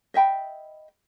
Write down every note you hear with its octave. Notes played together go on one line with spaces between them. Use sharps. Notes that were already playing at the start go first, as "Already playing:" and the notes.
D#5 E5 G5 B5